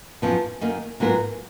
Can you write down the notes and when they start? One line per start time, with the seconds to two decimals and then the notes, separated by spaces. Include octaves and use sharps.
0.22 F#2 F3 B3
0.61 F#2 D#3 A#3
1.00 G#2 F#3 B3 F4 A#4